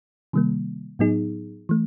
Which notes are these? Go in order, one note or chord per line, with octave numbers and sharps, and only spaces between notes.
C3 D#3 G3 A#3
A2 F#3 B3 D#4 G#4
E3 A3